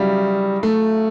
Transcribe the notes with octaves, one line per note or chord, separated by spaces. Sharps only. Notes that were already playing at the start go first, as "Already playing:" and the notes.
Already playing: C#3 F#3 G3 E4
A3